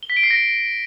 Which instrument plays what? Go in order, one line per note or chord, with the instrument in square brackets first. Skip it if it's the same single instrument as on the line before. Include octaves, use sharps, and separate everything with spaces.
[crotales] G7
B6
D7
C7
A#6